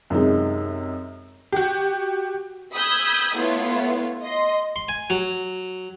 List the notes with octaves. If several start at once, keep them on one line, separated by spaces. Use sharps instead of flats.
F#2 C3 G#3 D#4
F#4 G4
B5 D#6 E6 G6 G#6
A3 B3 E4 F4 C#5
D#5 C6
C6
G#5
F#3